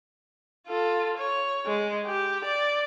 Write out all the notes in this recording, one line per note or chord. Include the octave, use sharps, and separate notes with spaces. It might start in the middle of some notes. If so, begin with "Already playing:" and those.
F4 A4
C#5
G#3
G4
D5